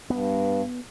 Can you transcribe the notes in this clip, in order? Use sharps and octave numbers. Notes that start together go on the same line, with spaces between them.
G2 B3